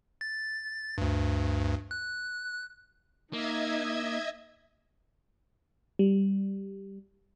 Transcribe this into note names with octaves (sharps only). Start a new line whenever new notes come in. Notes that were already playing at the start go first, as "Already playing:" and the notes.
A6
D2 G2
F#6
A#3 D#4 D#5 E5 G#6
G3